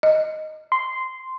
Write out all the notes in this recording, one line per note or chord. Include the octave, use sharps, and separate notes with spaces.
D#5
C6